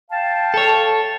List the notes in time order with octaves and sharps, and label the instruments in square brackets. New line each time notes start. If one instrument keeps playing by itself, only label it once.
[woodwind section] F5 G5 A5
[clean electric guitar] A4 C#5